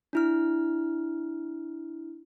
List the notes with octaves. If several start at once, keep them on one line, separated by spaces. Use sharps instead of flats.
D4 E4 F6